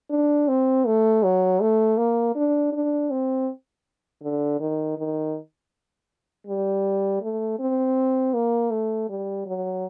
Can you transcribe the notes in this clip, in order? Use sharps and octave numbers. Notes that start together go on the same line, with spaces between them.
D4
C4
A3
F#3
A3
A#3
D4
D4
C4
D3
D#3
D#3
G3
A3
C4
A#3
A3
G3
F#3